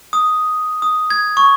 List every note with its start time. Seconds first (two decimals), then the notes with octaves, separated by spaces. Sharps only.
0.13 D#6
0.82 D#6
1.10 G#6
1.37 C#6